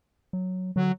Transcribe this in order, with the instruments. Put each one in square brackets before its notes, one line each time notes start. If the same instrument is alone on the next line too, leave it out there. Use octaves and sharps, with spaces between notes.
[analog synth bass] F#3
[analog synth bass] D3 [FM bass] F#3